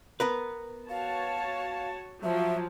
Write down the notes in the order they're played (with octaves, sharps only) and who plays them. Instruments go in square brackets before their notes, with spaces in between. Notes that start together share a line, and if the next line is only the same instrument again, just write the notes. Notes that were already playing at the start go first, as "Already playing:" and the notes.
[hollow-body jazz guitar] B3 A#4 B4
[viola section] F#4 C#5 A5 [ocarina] F5
[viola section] F3 F#3 [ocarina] E5